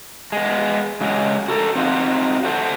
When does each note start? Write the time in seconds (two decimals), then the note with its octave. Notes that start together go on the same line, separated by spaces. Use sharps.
0.32 G#3 B3
1.01 C#3 F#3 G#3
1.48 F#4 A4 A#4
1.75 C4 D#4 F4 F#4
2.43 F#4 A4 C5 F#5